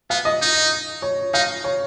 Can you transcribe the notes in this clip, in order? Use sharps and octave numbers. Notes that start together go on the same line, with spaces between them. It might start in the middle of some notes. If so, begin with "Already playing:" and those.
B3 F5
D#5
D#4
C#5
D#4 F5
C#5